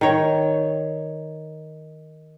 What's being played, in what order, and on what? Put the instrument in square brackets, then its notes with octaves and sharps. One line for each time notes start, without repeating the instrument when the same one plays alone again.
[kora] D#3 C#5